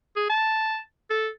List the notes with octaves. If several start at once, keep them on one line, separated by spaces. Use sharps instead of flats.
G#4
A5
A4